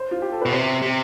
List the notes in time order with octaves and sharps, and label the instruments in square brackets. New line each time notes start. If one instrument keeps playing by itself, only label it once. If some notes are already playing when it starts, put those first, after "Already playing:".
Already playing: [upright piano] C5
F4
G4
A4
[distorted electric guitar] B2 [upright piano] B4
[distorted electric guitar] C3 [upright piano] C5
[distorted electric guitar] C3